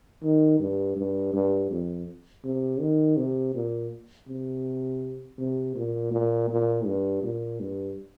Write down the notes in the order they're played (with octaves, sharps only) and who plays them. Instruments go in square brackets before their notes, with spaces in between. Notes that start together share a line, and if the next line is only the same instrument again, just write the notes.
[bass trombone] D#3
G2
G2
G2
F2
C3
D#3
C3
A#2
C3
C3
A#2
A#2
A#2
G2
A#2
G2